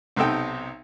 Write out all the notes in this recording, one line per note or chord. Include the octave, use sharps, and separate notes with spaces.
B1 C3 D#4 A4 G5